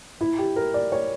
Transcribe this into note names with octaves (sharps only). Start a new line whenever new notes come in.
E4
G4
A#4
D5
C#5